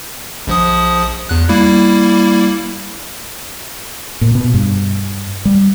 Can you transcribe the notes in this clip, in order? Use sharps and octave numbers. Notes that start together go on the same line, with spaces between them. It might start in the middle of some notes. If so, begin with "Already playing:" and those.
A#1 F3 D#6
E2 F#6
G3 A#3 E4
A#2
B2
G2
G3